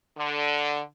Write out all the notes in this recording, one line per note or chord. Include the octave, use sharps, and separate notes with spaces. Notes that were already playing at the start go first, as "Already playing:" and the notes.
D3